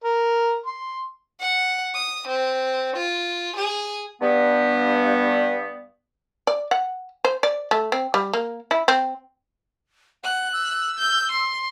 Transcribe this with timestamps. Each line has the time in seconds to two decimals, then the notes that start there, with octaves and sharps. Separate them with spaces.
0.04 A#4
0.66 C6
1.41 F#5
1.95 D#6
2.28 C4
2.96 F4
3.57 G#4
4.21 G2 B3
6.47 D5
6.71 F#5
7.24 C5
7.43 D5
7.71 A3
7.92 C4
8.14 G3
8.33 A#3
8.71 E4
8.88 C4
10.24 F#5 F#6
10.53 E6
10.98 G6
11.31 C6